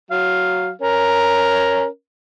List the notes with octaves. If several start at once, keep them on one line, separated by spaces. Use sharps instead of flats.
F#3 F5
C#4 A#4